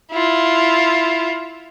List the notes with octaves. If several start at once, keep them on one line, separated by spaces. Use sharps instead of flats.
E4 F4